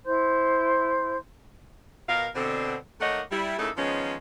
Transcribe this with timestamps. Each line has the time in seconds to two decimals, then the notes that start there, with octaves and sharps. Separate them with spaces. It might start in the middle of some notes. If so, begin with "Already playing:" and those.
0.06 E4 C5 C6 G6
2.08 B2 A#4 F5
2.34 B2 D3 C4
3.01 D#3 A3 A#3 C#5 D#5 F#5
3.31 G3 E4
3.59 C#3 A3 A#3 D#4 E4 A4
3.77 D#3 F3 G#3 B3 C#4